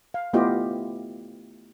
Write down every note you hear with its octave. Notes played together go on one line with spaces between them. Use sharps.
F5
A3 B3 E4 F4 G4 D#5